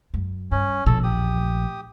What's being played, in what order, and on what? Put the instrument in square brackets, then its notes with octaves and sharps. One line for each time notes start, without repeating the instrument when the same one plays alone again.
[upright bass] F#2
[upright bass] G2 [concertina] C#4
[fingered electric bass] A#1 [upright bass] B2 [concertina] A4
[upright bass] E2 [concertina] G4 D#6
[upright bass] A3